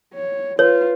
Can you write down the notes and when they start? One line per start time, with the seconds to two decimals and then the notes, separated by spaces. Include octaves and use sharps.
0.13 C#5
0.59 F4 B4 C#5